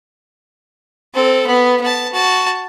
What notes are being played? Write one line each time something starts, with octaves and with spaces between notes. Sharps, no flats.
C4 A4
B3
B3 A5
F#4 A5